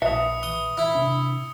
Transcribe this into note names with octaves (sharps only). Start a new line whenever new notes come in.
A#1 B4 E5 D#6 C#7
D#6 G7
E4
C3 D4